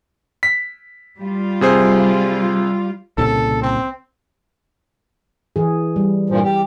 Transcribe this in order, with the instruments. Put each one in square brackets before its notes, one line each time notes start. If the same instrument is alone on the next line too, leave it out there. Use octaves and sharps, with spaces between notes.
[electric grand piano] B6
[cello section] G3 F4
[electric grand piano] C3 G#4 C5
[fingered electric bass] C2 A#2 C#3 [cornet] A4
[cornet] C4
[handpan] E3 G#4
G3
[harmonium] G2 A#2 F3
G4